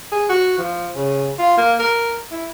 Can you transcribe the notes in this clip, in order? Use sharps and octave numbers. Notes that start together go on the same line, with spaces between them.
G#4
F#4
F3
C#3
F4
A#3
A#4
E4